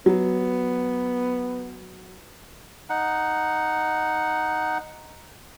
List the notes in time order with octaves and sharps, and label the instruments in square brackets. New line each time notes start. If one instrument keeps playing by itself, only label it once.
[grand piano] F#3 [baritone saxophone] B3
[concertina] D#4 F#5